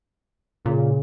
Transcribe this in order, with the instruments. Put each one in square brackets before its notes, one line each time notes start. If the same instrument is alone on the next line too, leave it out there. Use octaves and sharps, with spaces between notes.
[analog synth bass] A#2 [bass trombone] C#3